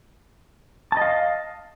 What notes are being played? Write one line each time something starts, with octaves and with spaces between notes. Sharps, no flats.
D#5 F5 A5